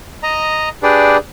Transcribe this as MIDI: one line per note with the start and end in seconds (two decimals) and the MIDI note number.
0.23 0.69 75
0.23 0.69 82
0.83 1.17 62
0.83 1.17 67
0.83 1.17 68
0.83 1.17 71
0.83 1.17 74